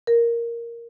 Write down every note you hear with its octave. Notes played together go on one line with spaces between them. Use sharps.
A#4